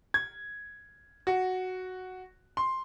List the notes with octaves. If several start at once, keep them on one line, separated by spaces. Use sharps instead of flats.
G#6
F#4
C6